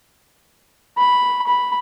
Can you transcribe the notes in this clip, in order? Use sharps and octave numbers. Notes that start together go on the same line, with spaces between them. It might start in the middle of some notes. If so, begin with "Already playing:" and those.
B5
B5